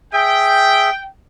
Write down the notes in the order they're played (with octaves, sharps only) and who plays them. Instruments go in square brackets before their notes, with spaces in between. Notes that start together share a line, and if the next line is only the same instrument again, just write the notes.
[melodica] G#4 E5 [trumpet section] G5